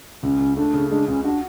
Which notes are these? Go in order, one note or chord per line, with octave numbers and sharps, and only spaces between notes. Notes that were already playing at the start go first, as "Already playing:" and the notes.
C#2 C#4
C#2
A3 D4
C#3
G#3 D4
C#2 C#4
D4 F#4